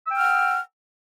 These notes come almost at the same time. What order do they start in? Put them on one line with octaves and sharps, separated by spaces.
E6 G5 F6 F#5